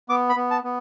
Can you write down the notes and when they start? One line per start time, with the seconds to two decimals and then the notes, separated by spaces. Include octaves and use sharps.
0.09 B3 D6
0.29 B5
0.36 B3
0.51 A5
0.64 B3